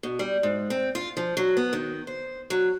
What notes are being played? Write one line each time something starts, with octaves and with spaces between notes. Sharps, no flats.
B2
G3
G#2
C4
F4
F3
F#3
B3
D#3
C5
F#3